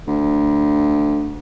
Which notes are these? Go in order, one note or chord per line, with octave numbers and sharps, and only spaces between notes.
D2